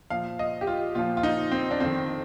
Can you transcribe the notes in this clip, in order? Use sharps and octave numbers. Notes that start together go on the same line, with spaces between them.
A#2 F3 F5
D#5
G4
F4
A#2 F3 F4
F4
D#4
C4
D4
F2 D#3 C4